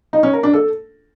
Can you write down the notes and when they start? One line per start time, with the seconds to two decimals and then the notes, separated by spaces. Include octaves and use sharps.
0.13 D#4
0.23 C#4
0.33 A#4
0.43 D4
0.53 A4